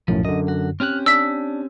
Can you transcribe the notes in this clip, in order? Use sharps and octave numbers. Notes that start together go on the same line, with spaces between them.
B1 F#2 A2 F3
F#2 D3 D#5
F#4
C4 C#4 G4 F6 F#6
D4 E6 B6